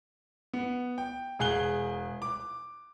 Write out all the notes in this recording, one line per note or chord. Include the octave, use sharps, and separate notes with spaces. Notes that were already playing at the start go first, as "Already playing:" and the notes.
B3
G5
E1 G#4 G#5 F#6 G7
D6